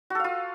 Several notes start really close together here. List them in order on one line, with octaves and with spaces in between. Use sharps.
F#4 A4 F5 F4